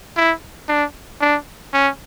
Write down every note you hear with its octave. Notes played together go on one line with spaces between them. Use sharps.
E4
D4
D4
C#4